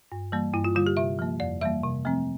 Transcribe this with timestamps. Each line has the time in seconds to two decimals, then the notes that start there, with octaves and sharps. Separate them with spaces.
0.12 G2
0.32 E3 G3 A#3
0.54 G2 E4
0.64 F4
0.75 D3 G3 F4
0.86 G4
0.97 C3 E5
1.19 F3 A#3
1.40 F2 D5
1.61 E3 G3 A#3 E5
1.84 C3
2.05 F3 A3 C4